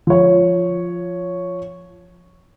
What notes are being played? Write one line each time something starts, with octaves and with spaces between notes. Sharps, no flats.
F3 C#5